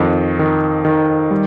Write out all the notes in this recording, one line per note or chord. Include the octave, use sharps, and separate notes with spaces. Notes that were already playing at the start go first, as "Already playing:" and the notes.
Already playing: F2 D#3
D#3
D#3
G3